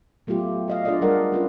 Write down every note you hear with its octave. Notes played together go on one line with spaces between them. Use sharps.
F#3 A3 B3 F4 G4
G4 D#5 F5
D4 F4 G#4 A4 D5 D#5
G3 A4 A#4 D5 D#5 F#5
C#4 F4 B4